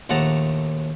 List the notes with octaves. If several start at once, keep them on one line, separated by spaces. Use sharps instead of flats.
A#1 D#2 A3 F#5 A5 A#5